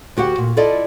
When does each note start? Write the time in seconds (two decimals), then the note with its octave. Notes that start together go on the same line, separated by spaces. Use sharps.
0.17 D2 F#4 G4 F#5
0.38 A#2
0.57 E4 F4 A4 D5 D#5